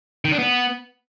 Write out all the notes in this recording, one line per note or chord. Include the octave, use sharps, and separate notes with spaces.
D#3
D4
B3